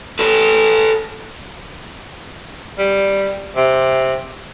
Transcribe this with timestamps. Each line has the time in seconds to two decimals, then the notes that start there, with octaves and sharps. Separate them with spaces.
0.19 A4 B4
2.79 G3
3.57 C3